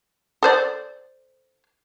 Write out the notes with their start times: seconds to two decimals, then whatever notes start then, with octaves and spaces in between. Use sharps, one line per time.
0.43 A4 C5 D5